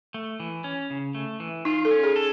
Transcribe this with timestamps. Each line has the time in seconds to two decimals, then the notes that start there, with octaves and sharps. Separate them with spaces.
0.14 A3
0.40 E3
0.64 C#4
0.90 C#3
1.15 A3
1.40 E3
1.65 D#4 F4
1.85 A4
1.91 C#4
2.03 G#4
2.16 A4